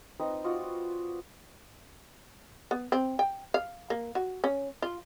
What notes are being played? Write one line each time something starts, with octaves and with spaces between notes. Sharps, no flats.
C4 D#4 B4 D#5
F4 F#4 D5 D#5
B3
C4
G5
F5
A#3
F#4
C#4
F4